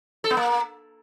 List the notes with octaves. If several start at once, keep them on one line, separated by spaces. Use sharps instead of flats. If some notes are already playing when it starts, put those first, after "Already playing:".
A4
B3
A#3